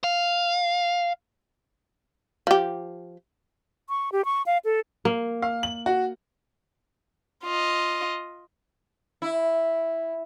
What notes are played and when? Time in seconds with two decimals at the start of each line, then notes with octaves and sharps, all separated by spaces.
0.04 F5
2.47 F3 G4
3.89 C#6
4.12 G4
4.25 C#6
4.46 F5
4.65 A4
5.05 A#3
5.42 F5
5.63 F#7
5.86 F#4
7.44 F4 D#5
9.22 E4